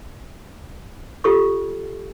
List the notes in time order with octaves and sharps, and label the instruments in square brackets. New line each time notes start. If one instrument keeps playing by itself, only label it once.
[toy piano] F4 G4 A4 C#6